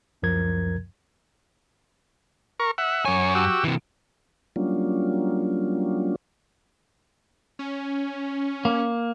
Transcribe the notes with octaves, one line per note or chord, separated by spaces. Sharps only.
C#2 F#2 F3 A#4 G#6
A#4 C#6
E5 F#5
F#2 C#5 G#5
F#4 G4 E6
C3 E3
F#3 G3 A#3 C#4 D4 F4
C#4
A#3